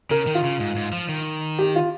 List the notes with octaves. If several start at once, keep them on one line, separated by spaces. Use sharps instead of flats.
C#3 A#4
D#3
F4
C#3
G#2
G#2
F3
D#3
G4
F4